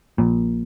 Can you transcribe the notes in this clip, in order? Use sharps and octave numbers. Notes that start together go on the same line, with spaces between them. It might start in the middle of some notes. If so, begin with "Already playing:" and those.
A#1 A#2